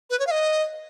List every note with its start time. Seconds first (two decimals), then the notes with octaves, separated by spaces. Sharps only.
0.10 B4
0.19 C#5
0.27 F5
0.31 D#5